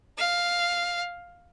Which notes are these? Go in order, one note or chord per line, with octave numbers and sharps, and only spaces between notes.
F5